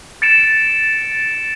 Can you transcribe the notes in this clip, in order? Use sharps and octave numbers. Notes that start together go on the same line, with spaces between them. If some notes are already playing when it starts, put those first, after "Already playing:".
A6 C#7 D7 E7